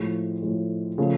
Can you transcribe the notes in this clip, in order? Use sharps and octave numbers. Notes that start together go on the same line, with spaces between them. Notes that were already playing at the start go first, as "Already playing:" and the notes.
Already playing: A2 F3 G#3
A2 F3 G#3
C#3 F3 A3